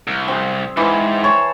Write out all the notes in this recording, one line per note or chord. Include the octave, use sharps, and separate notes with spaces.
C2
C4 G#4
G#2 E3 C5
C5 C#5 A5